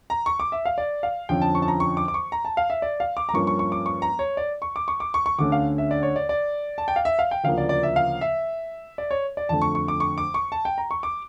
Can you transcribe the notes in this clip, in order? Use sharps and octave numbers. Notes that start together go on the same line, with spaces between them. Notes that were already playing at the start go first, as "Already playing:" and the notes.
A#5
C#6
D6
E5
F5
D5
F5
F2 D3 F3 C#4 G5
A5
C#6
A5
A#5
C#6
D6
D6
C#6
A#5
A5
F5
E5
D5
F5
D6
A#5
G2 F3 A#3 C#4 C#6
C#6
C#6
D6
C#6
A#5
C#5
D5
C#6
D6
C#6
D6
C#6
C#6
D2 D3 A3 C#4 D6
F5
E5
D5
C#5
D5
D5
A5
G5
F5
E5
F5
G5
D2 C#3 F3 A#3 F5
D5
D5
E5
F5
E5
D5
C#5
D5
F2 D3 A3 A5
C#6
C#6
D6
C#6
D6
C#6
A5
G5
A#5
C#6
D6